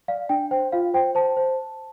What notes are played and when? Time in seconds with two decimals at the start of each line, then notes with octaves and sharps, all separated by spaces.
0.08 D5 F5
0.29 D4 G5
0.51 C5 G5
0.72 F4 F5
0.94 C5 G5
1.15 C5 A5
1.37 C5